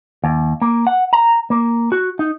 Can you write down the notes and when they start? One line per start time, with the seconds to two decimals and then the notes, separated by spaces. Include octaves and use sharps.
0.24 D#2
0.62 A#3
0.87 F#5
1.13 A#5
1.50 A#3
1.92 F#4
2.19 D#4